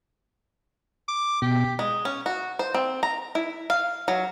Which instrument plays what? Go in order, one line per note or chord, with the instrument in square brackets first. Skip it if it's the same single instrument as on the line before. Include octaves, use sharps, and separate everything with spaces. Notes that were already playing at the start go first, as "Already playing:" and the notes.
[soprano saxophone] D6
[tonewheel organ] B2 [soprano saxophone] G4
[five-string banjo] G#3
C#4
F#4
C5
C4
A#5
E4
F5
F#3